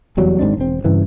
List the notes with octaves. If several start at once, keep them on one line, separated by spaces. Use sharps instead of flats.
F1 E2 F#3 G3
G#1 G#2 C4 D4
E1 C4
G2 C#3 E3